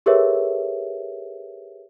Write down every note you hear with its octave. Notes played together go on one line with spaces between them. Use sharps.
G4 G#4 A#4 B4 C#5 E5